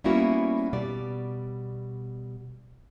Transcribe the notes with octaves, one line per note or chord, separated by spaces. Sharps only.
G3 A#3 B3 C#4 E4 F#4
B2 G3 D5